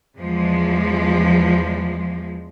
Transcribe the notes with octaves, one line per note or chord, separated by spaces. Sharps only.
E2 F3 G#3